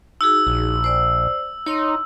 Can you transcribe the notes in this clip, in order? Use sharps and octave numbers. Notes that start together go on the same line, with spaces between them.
D#4 F#4 G#4 E6
A#1
C5 D5
D#4 C#5 C6